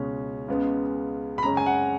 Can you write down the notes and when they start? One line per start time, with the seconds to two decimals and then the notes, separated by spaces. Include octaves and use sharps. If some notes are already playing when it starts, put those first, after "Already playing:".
Already playing: C#2 B2 G#3 C#4
0.48 C#2 C#3 G#3 B3
1.38 B5
1.42 F#2 C#3 G#3 C#4 A#5
1.57 G#5
1.66 F#5